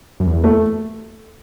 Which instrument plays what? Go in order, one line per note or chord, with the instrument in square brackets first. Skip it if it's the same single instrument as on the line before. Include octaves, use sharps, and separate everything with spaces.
[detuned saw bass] F#2
E2
[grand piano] A3